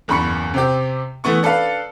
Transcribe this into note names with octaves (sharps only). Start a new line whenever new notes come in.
F#1 E2 G2 B5 C#6 C#7
C3 C4 G4
E3 A3 B3 C#6
D4 A4 B4 F5